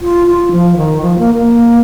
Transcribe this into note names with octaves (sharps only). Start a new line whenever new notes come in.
F4
F4
F3
D#3
F3
A#3
A#3